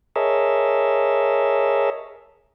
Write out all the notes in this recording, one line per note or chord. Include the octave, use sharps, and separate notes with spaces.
G#4 A#4 C#5 D#5 E5 A5